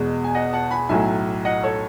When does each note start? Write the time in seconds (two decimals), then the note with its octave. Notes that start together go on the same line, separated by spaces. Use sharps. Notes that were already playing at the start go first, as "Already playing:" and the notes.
Already playing: E2 B2 G#3
0.24 G#5
0.35 D#5 F#5
0.53 F#5 A5
0.71 G#5 B5
0.89 B1 A2 F#3 E5 G#5
1.45 D#5 F#5
1.63 A4 C#5